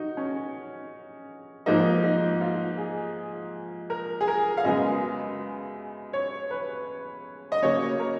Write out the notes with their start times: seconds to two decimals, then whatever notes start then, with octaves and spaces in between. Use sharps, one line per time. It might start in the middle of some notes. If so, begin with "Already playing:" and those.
Already playing: D#4 F#4
0.17 C#4
1.66 G#2 F3 A#3 D#4
2.03 D#4
2.41 F4
2.78 G#4
3.90 A#4
4.21 G#4
4.28 A#4
4.57 F5
4.64 F#2 C#3 G#3 B3 D#5
6.13 C#5
6.51 B4
7.52 D#5
7.62 C#3 F#3 A#3 C#5
8.00 A#4